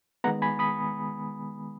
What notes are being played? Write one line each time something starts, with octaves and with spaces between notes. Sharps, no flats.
D#3 G#3 B3 F#5 A#5
G#5 B5
B5 D#6